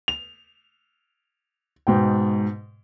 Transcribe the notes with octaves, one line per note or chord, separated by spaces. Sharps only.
F7
G#2 B2 G5